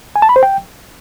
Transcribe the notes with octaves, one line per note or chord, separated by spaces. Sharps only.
G#5
A5
B5
C5
G5